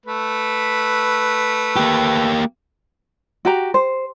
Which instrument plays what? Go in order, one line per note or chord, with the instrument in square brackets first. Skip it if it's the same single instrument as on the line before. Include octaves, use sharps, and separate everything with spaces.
[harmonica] A3 B4
[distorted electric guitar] A#3 G4
[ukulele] F#4 G4 A#5
C5